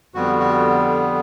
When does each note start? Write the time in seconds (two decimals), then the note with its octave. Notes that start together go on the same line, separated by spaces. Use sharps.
0.14 F2 D3 G3 B3 F#4
0.39 F#4